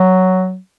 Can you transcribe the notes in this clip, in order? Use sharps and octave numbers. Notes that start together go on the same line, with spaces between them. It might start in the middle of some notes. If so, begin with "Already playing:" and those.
Already playing: F#3